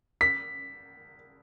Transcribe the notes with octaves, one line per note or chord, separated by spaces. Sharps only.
B6